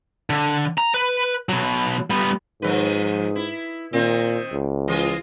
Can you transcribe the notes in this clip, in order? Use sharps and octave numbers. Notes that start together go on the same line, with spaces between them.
D3
A#5
B4
B2 F#3
G3 B3
G#2 D#3 F3 B4
E4
A#2 D#3 C4
C#2
E3 F4 G#4